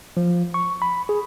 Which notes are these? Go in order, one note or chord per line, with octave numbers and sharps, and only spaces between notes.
F3
C#6
B5
G#4